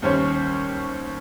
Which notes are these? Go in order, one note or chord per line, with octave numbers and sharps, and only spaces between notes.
D#2 G3 C#4 C5 C#5